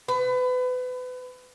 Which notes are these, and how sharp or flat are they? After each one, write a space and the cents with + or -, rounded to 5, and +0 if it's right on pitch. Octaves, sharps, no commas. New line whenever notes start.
B4 +30